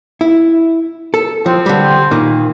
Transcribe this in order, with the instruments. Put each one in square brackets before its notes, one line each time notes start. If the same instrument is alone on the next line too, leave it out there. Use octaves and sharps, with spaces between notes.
[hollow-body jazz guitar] E4
A4
[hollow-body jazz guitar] F3 [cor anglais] C4
[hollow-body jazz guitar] D3 G3
A#2 D#3 A#3